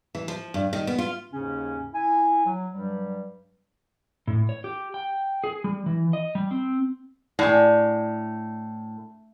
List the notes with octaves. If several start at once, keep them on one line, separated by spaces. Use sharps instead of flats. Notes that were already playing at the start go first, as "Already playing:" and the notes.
E3
F3
G2
D#3
B3
F4
D#2 G#2 C#3 C#4
E4 G#5
F#3
G2 F#3 G3
A2
C#5
G4
G5
G#4
G3
E3
D#5
G3
C4
A2 D4 G#4